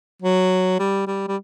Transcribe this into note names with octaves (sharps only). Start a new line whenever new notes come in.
F#3
G3
G3
G3